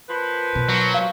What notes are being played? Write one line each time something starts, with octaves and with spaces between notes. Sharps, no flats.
F3 A#3 B4
B2
F#3
F5